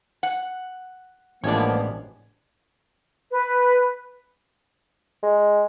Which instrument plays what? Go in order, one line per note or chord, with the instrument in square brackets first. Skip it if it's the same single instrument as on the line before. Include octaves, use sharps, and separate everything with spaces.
[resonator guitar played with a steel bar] F#5
[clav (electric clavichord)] A1 G#3 D4 [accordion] F3 A#3 B3 [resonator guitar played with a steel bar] C#5 D5
[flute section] B4
[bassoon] G#3